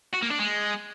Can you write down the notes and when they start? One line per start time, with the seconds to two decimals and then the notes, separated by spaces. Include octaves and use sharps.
0.14 F#4
0.23 A#3
0.31 D4
0.39 G#3